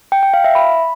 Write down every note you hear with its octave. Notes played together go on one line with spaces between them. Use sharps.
G5
G5
F5
E5
B5